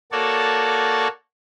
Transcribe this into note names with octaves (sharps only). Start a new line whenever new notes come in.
A#3 F#4 A4 C#5 D5 A5